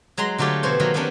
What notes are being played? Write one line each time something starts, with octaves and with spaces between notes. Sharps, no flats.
F#3 G#3 A#5 C6
D3 F#3 A3 F4 G4 C#5
B2 E3 E4 C5 C#5
D#3 F#3 A#3
F#3 A3 B3 C#4 D4 G4